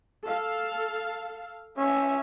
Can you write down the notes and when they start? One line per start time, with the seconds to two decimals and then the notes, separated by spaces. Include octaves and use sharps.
0.24 A4 F5
1.77 C#4 E5